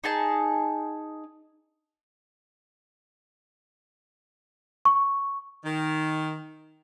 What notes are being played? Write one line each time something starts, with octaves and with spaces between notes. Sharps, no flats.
D#4 G#4 A5
C#6
D#3